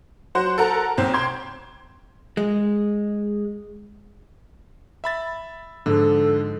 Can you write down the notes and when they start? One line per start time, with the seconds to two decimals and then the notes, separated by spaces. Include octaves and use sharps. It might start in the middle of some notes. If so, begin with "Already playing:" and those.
0.35 F#3 C5 F#5
0.58 A4 A#4 F#5 A#5
0.98 B1 C4
1.14 G5 C6 G#6
2.37 G#3
5.04 E5 B5 A6
5.86 G#2 D3 F3 A4